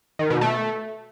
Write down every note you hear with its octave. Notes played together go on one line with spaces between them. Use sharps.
D#3
B2
A3